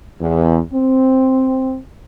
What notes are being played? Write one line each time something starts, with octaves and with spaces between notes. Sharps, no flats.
E2
C4